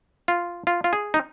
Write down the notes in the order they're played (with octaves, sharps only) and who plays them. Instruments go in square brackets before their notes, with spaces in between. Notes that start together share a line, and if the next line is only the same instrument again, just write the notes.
[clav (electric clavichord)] F4
F4
F4
G#4
D#4